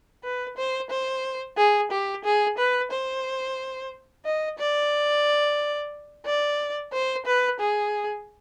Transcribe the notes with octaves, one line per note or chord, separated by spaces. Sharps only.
B4
C5
C5
G#4
G4
G#4
B4
C5
D#5
D5
D5
C5
B4
G#4